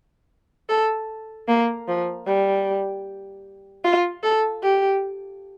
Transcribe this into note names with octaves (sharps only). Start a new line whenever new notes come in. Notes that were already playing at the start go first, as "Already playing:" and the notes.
A4
A#3
F3
G3
F4
A4
G4